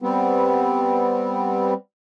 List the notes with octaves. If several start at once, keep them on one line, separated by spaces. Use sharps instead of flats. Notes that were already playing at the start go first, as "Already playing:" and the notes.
G3 B3 C4